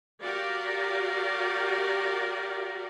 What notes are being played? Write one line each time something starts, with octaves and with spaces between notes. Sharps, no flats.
F#4 G4 A#4 D5 F5